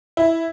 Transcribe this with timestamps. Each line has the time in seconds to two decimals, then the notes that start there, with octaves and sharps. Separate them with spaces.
0.17 E4